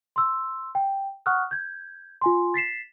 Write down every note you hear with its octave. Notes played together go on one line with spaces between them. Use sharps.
C6 E6
G5
F#5 C#6 D#6 F6 F#6
G6 G#6
F4 G#5 C6
A6 B6 C7 E7